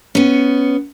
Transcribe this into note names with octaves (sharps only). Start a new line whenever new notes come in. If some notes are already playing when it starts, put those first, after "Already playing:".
B3 C#4